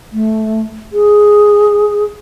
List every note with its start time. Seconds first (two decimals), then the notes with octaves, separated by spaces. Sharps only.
0.13 A3
0.93 G#4